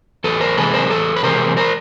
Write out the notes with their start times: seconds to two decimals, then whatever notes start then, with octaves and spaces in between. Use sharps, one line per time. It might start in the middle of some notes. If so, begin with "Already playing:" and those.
0.24 E2 A4 B4
0.40 A#4 C5
0.57 C3 E3 G#3 A4 B4
0.74 A#4 C5
0.90 E2 A4 B4
1.16 B4
1.23 C3 E3 G#3 A#4 C5
1.57 A#4 C5